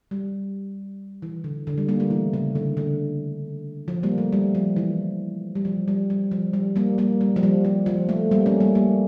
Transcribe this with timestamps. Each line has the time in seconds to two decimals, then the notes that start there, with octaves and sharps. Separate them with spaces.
0.11 G3
1.22 E3
1.44 D3
1.67 D3
1.78 G3
1.88 G3 A#3
2.00 A3
2.10 E3
2.33 C#3
2.55 D3
2.77 D3
3.88 F3
4.03 G3 A#3
4.18 A3
4.32 G3
4.55 F3
4.76 E3
5.55 G3
5.65 F3
5.88 G3
6.10 G3
6.31 F3
6.53 G3
6.76 G3 A#3
6.98 G3 A#3
7.21 G3
7.36 F3
7.43 G3
7.65 F3
7.86 F3
8.09 A3
8.31 G3 A#3
8.46 A3 C#4
8.60 G3 A#3
8.75 G3 A#3